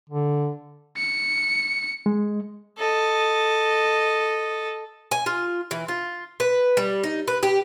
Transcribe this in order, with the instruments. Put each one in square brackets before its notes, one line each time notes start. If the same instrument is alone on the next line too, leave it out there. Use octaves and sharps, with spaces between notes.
[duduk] D3
[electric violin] C#7
[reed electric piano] G#3
[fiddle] A4 D#5
[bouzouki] G#5
F4
E3
F4
B4
G3
D#4
B4
G4